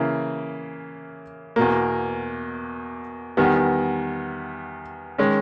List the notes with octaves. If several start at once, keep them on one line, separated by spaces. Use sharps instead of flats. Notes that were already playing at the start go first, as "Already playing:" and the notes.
Already playing: C#3 E3 A#3
E2 B2 A#3
E2 D#3 G3 B3
D#3 G#3 C#4